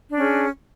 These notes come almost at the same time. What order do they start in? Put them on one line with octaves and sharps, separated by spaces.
D4 C#4 G#4